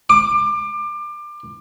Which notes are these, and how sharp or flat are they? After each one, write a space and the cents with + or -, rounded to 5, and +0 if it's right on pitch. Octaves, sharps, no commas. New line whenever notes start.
D6 +25